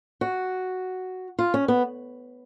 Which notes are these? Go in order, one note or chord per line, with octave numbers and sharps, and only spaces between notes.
F#4
F4
C#4
B3